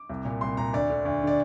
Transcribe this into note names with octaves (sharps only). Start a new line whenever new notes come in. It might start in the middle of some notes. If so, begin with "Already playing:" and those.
Already playing: D6
C2
A#2
C2 C6
A#2 A#5
D2 D5
D3
D2
D3
D5